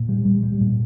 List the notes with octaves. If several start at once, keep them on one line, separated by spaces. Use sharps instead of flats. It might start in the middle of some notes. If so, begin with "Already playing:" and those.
Already playing: A#2
G3
G3
G3
A#2